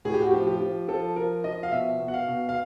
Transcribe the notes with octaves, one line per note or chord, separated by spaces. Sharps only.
A2 G#4
G4
F#4
F3 G4
G4
F3
F3 A4
F3 A#4
F3 D#5
F5
B2 E5
B2
F#5
F5
B2
F5